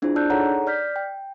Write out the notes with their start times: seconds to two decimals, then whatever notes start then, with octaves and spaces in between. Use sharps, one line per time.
0.02 C4 D4 E4 F4 G#4 C5
0.16 D4 D5 A5 E6 F#6 G6
0.30 D#4 G#4 A4 C#5 F#5 A#5
0.67 D5 F6 G6 B6
0.96 G5